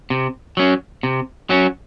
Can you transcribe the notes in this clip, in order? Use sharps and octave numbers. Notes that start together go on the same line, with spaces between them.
C3
F#3 C#4
C3
F#3 C#4